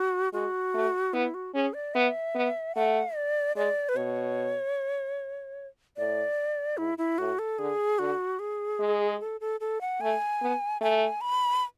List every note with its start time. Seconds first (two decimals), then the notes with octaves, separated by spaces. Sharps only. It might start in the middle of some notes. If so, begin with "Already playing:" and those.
Already playing: F#4
0.33 G#3 F#4
0.74 A3
1.13 B3 E4
1.34 F#4
1.54 C#4 G#4
1.74 D5
1.94 B3 E5
2.35 B3
2.75 A3 F#5
3.15 D5
3.55 G#3 D5
3.89 B4
3.96 B2 C#5
5.97 A2 D5
6.78 G#2 E4
6.98 E4
7.18 A2 F#4
7.39 A4
7.59 D3 G#4
7.99 D3 F#4
8.39 G#4
8.79 G#3
9.20 A4
9.41 A4
9.60 A4
9.81 F#5
10.01 A3 G#5
10.41 B3
10.81 A3 G#5
11.21 B5